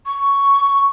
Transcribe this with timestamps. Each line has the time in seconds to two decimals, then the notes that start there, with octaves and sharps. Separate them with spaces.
0.06 C#6